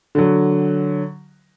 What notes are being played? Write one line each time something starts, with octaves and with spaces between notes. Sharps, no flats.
D3 F#3